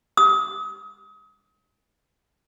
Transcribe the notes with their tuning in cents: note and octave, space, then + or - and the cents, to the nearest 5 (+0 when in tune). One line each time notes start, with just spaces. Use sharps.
D#6 +35